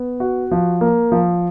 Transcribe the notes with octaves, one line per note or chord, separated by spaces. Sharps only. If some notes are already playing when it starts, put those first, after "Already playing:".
Already playing: B3
F#4
F3
A#3
F3